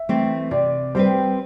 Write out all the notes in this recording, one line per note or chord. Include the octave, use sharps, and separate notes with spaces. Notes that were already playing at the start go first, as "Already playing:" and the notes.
Already playing: E5
E3 A3 C4
C3 D5
G3 C4 G4 B4 C5